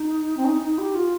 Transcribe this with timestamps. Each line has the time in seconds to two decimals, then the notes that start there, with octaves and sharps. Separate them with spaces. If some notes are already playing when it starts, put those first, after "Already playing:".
Already playing: D#4
0.37 C4
0.45 D#4
0.62 D#4
0.78 G4
0.95 F4